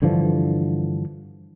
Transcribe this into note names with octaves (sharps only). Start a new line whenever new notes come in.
G2 D3 E3 F3